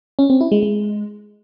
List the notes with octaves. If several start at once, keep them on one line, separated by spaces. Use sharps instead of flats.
C#4
C4
E4
G#3
G#3